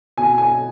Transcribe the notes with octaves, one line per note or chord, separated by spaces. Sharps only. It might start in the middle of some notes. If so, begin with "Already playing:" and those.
B2 G#5
G#5